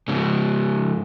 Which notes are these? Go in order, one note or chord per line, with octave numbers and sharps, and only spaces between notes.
G#2 C#3